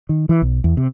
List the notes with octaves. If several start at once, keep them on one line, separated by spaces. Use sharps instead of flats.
D#3
E3
B1
E2
C3